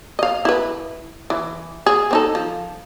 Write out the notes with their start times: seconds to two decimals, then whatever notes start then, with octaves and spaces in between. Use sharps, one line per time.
0.19 D#5 F5
0.45 E4 B4
1.30 E3
1.86 G#4
2.11 C4 D#4 A4
2.35 F3